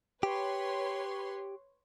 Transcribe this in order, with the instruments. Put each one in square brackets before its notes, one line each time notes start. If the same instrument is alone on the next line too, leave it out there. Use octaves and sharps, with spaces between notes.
[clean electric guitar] G4 [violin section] B4 C#5 C6